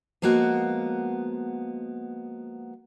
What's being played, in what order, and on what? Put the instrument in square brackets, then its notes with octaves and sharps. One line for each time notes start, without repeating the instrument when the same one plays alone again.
[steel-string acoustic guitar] F3 G#3 A#3 B3 F#4